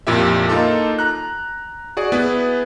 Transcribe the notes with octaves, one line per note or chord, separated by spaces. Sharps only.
F2 A#2 E4 G4 E5
A#3 D#4 F4 A4 A5
A#5 F#6
F#4 G#4 D5
B3 E4 G#4 B4